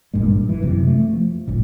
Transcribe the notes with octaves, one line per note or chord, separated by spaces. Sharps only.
G#1 G2 A#2 G#3
E3
F#2 C3 E3
A3
F3
D1 G#1 F#2 A#2